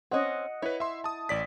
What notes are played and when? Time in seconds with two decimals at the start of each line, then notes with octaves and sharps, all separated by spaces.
0.12 C4 C#4 D#5 F#5
0.62 E4 B4 C#5
0.80 E5 C6
1.04 A5 D#6
1.29 A1 D5 B6